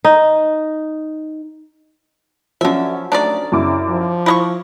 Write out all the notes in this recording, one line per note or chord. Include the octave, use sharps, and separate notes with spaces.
D#4
D3 F3 F#3 C#4 E5
A3 D4 D#4 D5
F#2 C#3 E4 D6
F3
E4 F4 D#5 C#6